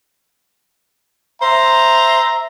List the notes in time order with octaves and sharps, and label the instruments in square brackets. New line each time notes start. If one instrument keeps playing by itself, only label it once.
[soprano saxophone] C5 [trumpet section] E5 A#5